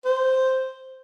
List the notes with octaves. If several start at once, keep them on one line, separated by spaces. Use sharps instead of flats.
C5